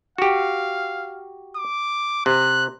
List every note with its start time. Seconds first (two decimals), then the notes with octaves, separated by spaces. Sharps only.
0.18 F#4 G4 F5
1.57 D6
2.26 C3 F#6